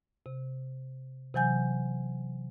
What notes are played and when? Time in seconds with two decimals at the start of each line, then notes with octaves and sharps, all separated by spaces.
0.26 C3
1.34 C3 E3 F#3 G#5 G6